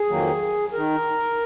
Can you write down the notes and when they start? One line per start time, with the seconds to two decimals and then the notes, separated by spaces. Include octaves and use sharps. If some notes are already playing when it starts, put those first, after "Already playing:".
Already playing: G#4
0.09 F2 D#3 F#3 A#3
0.73 D#3 A#4